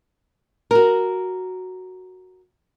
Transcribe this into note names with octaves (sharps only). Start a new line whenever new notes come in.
F#4 A#4